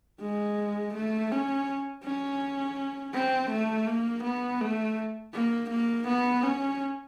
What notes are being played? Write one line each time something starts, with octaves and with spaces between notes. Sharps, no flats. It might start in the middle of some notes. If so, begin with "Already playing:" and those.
G#3
A3
C#4
C#4
C4
A3
A#3
B3
A3
A#3
A#3
B3
C#4